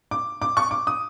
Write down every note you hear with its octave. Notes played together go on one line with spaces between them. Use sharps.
D6
D6
C#6
D6
D#6